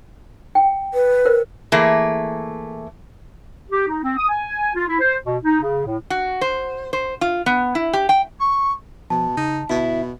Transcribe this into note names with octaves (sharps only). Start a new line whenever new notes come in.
G5
B4
A#4 C5
E3 A3 A#3 G#4
G4
D#4
C4
D#6
G#5
F4
E4
C5
B2
D#4
C#3
A2
F#4
C5
C5
F4
B3
E4
G4
G5
C#6
B2 F3 A5
C#3 D#4
G1 B2 E4